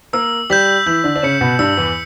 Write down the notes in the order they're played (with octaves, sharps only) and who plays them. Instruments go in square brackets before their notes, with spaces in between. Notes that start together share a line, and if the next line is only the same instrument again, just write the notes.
[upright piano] A#3 A#4 [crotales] E6
[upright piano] G3 G4 [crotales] G6 B6 F#7
[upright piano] E3 E4 [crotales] G6
[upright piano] D3 D4
D4
[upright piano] C#3 C#4 [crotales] C#7 E7
[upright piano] B2 B3
[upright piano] G2 G3 [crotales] E6
[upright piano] E2 E3